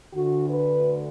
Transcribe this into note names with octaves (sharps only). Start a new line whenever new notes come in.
D2 D3 F#4
B4